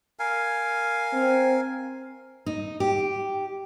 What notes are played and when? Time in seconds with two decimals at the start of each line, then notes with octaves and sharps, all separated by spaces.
0.19 A#4 F5 G#5
1.13 C4
2.46 D#4
2.80 G4